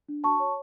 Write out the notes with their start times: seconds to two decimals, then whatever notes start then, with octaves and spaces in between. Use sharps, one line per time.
0.09 D4
0.24 F#4 A5 C#6
0.40 C#5